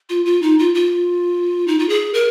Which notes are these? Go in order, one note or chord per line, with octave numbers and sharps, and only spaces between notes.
F4
F4
D#4
F4
F4
D#4
F4
G#4
A#4